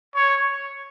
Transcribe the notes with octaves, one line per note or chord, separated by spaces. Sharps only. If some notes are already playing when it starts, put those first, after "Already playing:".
C#5